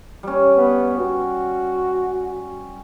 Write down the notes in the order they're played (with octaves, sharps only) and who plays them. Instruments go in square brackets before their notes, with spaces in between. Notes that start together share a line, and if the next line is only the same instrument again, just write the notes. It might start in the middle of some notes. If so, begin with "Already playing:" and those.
[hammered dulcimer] G3 C#4
[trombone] B3
F#4